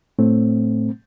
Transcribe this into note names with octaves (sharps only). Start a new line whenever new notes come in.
A2 A3 C4